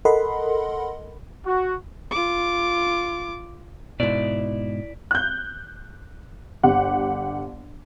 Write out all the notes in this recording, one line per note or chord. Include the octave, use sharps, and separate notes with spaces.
A4 A#4 D#5 F#5 B5 C6
F#4
F4 D6
G#2 B2 E4 D5
F#6 G6
G1 G4 F#5